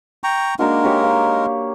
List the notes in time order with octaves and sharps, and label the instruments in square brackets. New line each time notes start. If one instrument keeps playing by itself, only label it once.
[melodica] G5 A#5 C#6
[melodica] G#3 D#4 A#4 [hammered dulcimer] A#3 D4 F#4
[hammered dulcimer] G4 C#5
F5